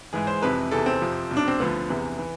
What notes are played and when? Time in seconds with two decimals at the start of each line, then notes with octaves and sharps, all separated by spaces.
0.13 G#2 E3 G#4
0.27 C5
0.42 F2 C3 E3 B4
0.71 E2 C3 E3 A4
0.86 C4
1.01 F2 C3 F3
1.31 C2 B2
1.37 D4
1.48 C4
1.60 D2 D3 F3 B3
1.89 E2 C3 E3
2.18 E3